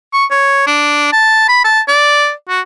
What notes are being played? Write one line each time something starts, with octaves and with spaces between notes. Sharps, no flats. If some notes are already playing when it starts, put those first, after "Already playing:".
C#6
C#5
D4
A5
B5
A5
D5
F#4